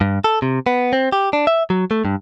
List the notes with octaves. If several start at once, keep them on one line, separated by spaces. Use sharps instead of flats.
G2
A4
C3
B3
C4
G4
D4
E5
F#3
A3
G2